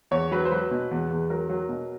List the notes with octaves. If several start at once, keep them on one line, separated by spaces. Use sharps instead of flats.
E2 C#5
F#3 B4
C5
F#3 B4
B2
E2
E2
F#3 A#4
F#3
B2